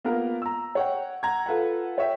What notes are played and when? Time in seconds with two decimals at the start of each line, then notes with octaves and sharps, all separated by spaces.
0.04 A#3 B3 F4 A#4
0.42 A#5 E6
0.75 C#5 F#5 G5
1.23 F#5 A#5 G#6
1.46 F4 A4 B4 F#5
1.98 C#5 E5 G5